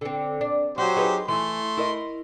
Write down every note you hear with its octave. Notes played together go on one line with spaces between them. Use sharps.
D3 C4
D4
F#3 F#4 G4 C5
D#4 G#4 B4
E3 A3 C6
E4 A#4 D#5